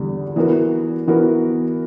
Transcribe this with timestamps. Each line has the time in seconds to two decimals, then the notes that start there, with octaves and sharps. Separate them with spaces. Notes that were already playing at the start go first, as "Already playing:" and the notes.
Already playing: E2 D3 G3
0.36 E3 B3 F#4 A#4
1.07 E3 B3 F#4 A#4